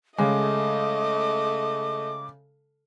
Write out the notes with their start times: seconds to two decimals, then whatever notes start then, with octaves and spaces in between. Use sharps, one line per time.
0.18 C#3 G#3 A3 D#5 D6